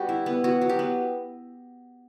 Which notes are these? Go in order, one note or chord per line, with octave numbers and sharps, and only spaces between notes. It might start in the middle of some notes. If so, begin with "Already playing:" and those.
Already playing: G3 B3 F#4
E4
B3
B3 F#4
F#3
G4
B3